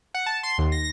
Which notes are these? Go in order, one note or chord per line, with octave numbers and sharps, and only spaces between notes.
F#5
A5
C6
D#2
A#6